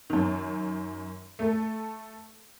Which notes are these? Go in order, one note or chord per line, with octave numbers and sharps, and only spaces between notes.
F#2 D#3
A3 A4